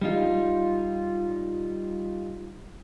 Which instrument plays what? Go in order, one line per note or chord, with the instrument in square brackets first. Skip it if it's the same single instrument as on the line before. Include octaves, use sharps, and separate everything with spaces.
[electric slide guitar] G3 D#4 F4